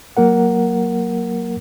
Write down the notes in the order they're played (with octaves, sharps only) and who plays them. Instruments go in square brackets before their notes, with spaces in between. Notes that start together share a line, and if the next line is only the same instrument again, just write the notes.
[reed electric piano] F#3 A#3 A#4 F#5